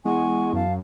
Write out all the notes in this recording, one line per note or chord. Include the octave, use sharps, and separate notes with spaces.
E2 G#3 F#5 G#5 C#6
F#2 F5 A5